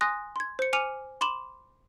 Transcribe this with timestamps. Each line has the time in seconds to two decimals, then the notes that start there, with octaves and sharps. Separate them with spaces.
0.01 G#5 C6 D#6 F#6 A#6
0.36 C6 G#6
0.59 C5 C#7
0.73 G#5 D6 F6 C#7 D#7 F7
1.21 B5 C6 D6 E7 F#7